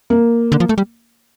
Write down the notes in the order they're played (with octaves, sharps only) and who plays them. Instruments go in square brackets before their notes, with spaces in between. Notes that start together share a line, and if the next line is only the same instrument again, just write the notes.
[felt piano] A#3
[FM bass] D3
F3
A3
G3